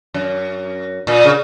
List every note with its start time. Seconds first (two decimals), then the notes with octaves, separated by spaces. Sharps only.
0.14 F#2
1.07 A#2
1.25 C#3